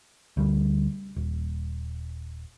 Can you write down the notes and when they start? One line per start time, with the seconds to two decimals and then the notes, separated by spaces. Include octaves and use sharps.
0.37 D2 G3
1.16 D#1